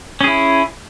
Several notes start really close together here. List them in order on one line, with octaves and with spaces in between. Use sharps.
C#4 G#4 E4